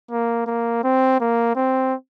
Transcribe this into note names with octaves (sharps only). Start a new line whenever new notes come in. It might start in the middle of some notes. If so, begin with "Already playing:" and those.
A#3
A#3
C4
A#3
C4